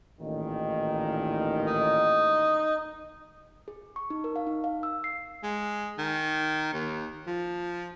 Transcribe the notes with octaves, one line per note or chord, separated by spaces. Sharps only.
A1 A#2 D#3
D#4
G#4
C#6
D#4
A#4
F5
D#4
F5
E6
C7
G#3
D#3
D#2
F3